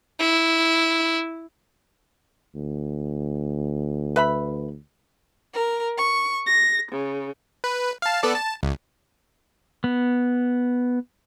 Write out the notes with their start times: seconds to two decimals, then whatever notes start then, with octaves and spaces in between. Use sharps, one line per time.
0.19 E4
2.55 D2
4.16 B4 E5 B5
5.54 A#4
5.97 C#6
6.47 A#6
6.91 C#3
7.64 B4
8.02 F5 A5
8.23 B3 A4 D5
8.35 A5
8.63 C#2
9.84 B3